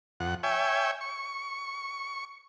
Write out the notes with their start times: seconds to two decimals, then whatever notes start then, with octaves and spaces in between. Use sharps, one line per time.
0.20 F2 F#5
0.43 C#5 E5 G5 G#5
1.01 C#6